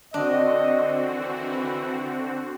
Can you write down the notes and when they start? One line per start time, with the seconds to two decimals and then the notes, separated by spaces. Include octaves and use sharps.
0.14 D3 C4 D4 F#4 D#5
1.08 D#3 E3